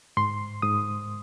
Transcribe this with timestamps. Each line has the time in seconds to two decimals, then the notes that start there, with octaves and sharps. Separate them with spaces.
0.17 G#2 C6
0.62 G#2 D#6